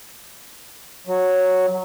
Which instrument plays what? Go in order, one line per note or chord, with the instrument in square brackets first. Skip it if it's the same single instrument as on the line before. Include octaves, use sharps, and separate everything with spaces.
[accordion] F#3